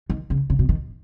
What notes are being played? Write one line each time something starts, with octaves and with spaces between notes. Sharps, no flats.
D#3
C#3
C#3
B2
D#3